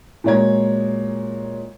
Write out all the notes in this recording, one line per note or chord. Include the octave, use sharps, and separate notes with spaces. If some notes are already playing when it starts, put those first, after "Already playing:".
A#2 F#3 G#3 C#5 A#5 G#6